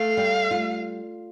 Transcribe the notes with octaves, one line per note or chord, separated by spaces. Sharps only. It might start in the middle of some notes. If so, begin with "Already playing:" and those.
Already playing: A3 F5
G3
F4